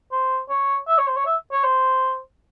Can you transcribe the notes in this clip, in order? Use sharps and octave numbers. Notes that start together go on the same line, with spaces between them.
C5
C#5
E5
C#5
C5
C#5
E5
C#5
C5